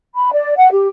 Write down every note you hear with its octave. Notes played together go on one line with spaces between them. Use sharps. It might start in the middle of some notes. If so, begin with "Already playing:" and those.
B5
D5
F#5
G4